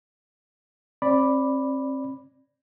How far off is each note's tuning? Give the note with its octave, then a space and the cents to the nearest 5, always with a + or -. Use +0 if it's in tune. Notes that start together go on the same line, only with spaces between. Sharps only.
C4 +35 D5 +0 B5 +0